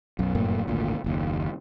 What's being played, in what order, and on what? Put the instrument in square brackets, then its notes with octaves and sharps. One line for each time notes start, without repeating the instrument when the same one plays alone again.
[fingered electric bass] B1 F#2
F1 F#2 A2 A#3
G#1 D2 A#2
F#1 D#2